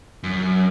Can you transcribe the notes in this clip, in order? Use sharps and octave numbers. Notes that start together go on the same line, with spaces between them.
F#2